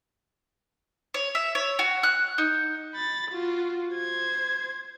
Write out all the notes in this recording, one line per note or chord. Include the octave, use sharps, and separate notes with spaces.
C#5
E5
C#5
F#4
F#6
D#4
B5 A6
F4 F#4
C5 G#6